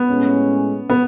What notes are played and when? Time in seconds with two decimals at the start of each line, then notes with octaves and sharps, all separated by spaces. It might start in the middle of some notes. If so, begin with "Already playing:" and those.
Already playing: B3
0.08 A2 G#3 C#4
0.90 B3